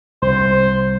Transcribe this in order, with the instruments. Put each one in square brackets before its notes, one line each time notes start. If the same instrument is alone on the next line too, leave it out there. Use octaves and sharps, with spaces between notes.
[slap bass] C2 [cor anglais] C5